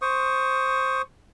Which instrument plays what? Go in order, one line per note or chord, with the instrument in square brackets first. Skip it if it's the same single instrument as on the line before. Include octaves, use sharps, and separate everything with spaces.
[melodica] C5 C#6 D#6